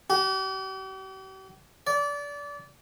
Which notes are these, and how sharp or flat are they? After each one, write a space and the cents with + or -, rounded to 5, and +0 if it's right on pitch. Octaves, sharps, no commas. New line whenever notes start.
G4 -45
D5 -25